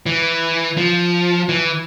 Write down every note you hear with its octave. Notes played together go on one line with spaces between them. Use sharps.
E3
F3
E3